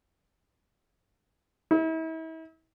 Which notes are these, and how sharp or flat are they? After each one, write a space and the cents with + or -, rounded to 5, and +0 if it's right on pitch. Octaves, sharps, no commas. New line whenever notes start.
E4 -40